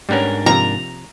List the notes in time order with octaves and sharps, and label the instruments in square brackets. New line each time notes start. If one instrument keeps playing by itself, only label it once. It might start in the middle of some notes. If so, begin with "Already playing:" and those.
[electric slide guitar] G#2 D4 A#4 [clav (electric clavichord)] G3 B3 C#4
[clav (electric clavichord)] C3 F3 [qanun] A#5